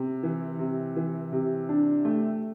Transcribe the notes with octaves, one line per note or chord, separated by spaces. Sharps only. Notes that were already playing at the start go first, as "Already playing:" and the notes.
Already playing: C3
E3
C3
E3
C3
D4
A3